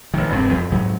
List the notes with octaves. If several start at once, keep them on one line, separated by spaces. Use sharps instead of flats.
A1 D#3
E1 G2 A3 C4
F2
G#2 F#3